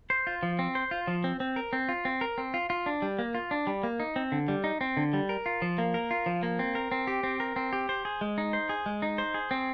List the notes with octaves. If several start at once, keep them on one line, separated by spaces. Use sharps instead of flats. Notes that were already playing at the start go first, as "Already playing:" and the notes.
C5
F4
F3
C4
C5
F4
F3
C4
C4
A#4
C4
F4
C4
A#4
C4
F4
F4
D4
G3
A#3
F4
D4
G3
A#3
D#4
C4
D3
G3
D#4
C4
D3
G3
A#4
F4
F3
A#3
A#4
F4
F3
A#3
C4
A#4
C4
G4
C4
A#4
C4
G4
C5
G#4
G#3
D#4
C5
G#4
G#3
D#4
C5
G#4
C4